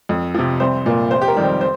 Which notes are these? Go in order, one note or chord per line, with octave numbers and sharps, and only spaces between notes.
F2
C3 F3
C2 C5
A#2 A#3
F1 C5
G4
A#4
F2 D#3 G3
C5
C5